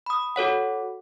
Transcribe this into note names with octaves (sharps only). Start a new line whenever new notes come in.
B5 D#6
F#4 A4 C#5 F#5